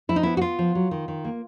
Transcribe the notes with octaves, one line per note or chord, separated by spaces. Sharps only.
F3 E4
D#4
B3 E4
F#4
B3 F4
F3
F#3
D#3
D#3
A#3